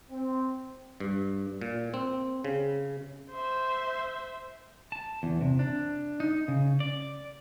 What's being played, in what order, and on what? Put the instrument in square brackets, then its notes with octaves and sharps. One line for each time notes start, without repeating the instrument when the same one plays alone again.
[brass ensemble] C4
[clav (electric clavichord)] G2
A#2
C4
C#3
[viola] C5 E5
[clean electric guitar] A5
E2
C3
D4
D#4
C#3
D5